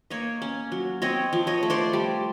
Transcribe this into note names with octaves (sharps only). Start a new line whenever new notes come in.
A#3 C#5 D#5
C#4
F#3
C4 C#5 D#5
F3
C#5 D#5
A3
C5 D5
G3